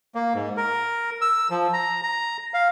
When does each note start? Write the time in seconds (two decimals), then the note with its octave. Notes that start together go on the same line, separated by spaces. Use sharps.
0.15 A#3
0.34 G#2
0.57 A#4
1.21 E6
1.50 F3
1.73 A#5
2.03 A#5
2.54 F5